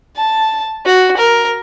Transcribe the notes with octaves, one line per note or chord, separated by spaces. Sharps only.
A5
F#4
A#4